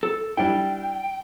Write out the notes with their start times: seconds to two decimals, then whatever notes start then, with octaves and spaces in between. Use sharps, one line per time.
0.03 A4
0.37 G3 D4 E4 G5